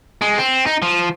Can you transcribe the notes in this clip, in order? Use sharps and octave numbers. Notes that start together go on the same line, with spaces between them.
G#3
C4
D#4
F3